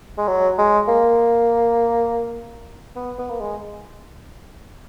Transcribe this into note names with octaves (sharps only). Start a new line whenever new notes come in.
G#3
F#3
G#3
A#3
B3
B3
A#3
G#3